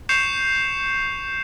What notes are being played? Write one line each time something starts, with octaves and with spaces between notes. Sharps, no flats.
C#6 G6 C7 C#7 E7 F7